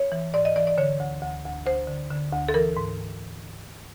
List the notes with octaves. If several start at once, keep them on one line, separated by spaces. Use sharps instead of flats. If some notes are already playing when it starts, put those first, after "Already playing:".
Already playing: C#5
E3
G#2 D5
D#5
E3 D5
D5
D3 C#5
D2
D2
D2
D2 C5
D3
D3
D2
A4
E3 A#4
G#2